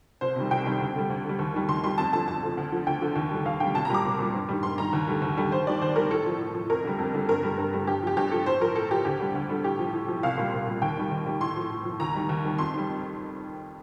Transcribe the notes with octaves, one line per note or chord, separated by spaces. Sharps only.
C2 C5
C3 D#3 G3
C2 G5
C3 D#3 G3
D2
D3 G3
D2
D3 G3
D#2
D#3 G3
D#2 C6
D#3 G3 C6
F2 A5
D3 F3 A5
F2 A5
D3 F3
D2
D3 F3
D2 G5
D3 F3
D#2
D3 G3
D#2 F5
D3 G3 G5
C2 A5
A#5
A#2 G3 D6
C2
A#2 G3
G2
D#3 G3
G2 C6
D#3 G3 A#5
D#2
D3 G3
D#2
D3 G3
D#2 C5
D#3 G3 D5
D#2 C5
D#3 G3 A#4
A2 A4
F3
A2
F3
F2 A#4
D3 G3
F2
D3 G3
G2 A#4
D3 G3
G2
D3 G3
G2 G4
F3 G4
G2 G4
F3 A4
A2 C5
F3 A#4
A2 A4
F3 G4
D2 G4
D3 G3
D2
D3 G3
A2 G4
F3
A2
F3
C2 F5
A#2 G3
C2
A#2 G3
D#2 G5
D#3 G3
D#2
D#3 G3
A2 C6
F3
A2
F3
D#2 A#5
D#3 G3
D#2
D#3 G3
F2 C6
D#3 G3